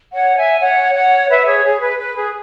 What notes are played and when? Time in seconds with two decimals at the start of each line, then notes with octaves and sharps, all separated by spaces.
0.13 C#5 F#5
0.36 E5 G#5
0.60 C#5 F#5
0.95 C#5 F#5
1.29 B4 E5
1.47 G#4 C#5
1.64 G#4
1.81 B4
1.99 B4
2.16 G#4